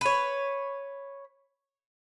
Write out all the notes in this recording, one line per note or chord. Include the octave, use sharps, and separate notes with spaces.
B4 C#5